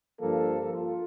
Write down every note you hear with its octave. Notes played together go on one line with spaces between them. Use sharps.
G2 F3 A#3 A4
F4